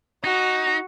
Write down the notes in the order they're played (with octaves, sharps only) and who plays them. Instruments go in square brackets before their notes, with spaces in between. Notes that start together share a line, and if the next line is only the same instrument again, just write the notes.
[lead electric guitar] D#4 [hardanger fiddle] F#4